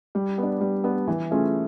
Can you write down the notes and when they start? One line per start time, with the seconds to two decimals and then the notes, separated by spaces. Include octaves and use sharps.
0.15 G3
0.38 B3 D4
0.61 G3
0.84 B3 D4
1.08 E3
1.31 A3 C#4 F4 G#4